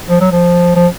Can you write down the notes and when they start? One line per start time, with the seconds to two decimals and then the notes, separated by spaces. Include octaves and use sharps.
0.09 F3
0.21 F#3
0.31 F3
0.76 F3